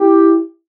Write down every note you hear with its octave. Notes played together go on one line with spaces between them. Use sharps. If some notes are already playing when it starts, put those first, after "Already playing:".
Already playing: E4 G4